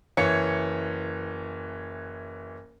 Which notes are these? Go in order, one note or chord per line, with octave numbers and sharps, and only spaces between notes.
F#1 E3 C#5 C#7